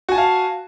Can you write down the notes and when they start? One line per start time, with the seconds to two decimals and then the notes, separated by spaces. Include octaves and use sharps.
0.09 F#4
0.12 G#5
0.15 A5
0.18 F5